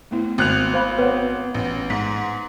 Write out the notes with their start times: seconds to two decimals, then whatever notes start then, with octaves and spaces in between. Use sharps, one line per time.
0.11 A3 B3 E4
0.38 G#1 F#6 F7
0.74 C5 F5 B5
0.98 B3 B4 C#5 F#5
1.54 A1
1.90 G#2 B6